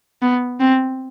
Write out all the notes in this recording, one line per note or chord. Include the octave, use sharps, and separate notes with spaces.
B3
C4